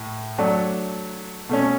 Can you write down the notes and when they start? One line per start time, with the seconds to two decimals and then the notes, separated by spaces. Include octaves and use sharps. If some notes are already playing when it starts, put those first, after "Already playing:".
Already playing: A2
0.38 F#3 A3 D4 A4
1.49 B2 A3 C#4